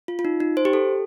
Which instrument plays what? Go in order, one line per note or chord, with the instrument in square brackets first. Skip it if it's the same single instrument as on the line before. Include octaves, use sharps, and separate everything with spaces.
[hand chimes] F4
F4
D#4
D#4
C5
G4
A4